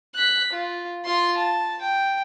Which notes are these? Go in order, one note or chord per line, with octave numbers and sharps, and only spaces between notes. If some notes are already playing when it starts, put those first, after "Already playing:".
F#6 B6
F4
F4 C6
A5
G5